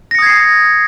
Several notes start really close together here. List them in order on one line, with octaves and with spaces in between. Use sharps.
A#6 C#7 D#6 G#6 C7